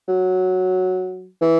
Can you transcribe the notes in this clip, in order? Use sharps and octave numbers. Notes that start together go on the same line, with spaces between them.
F#3
E3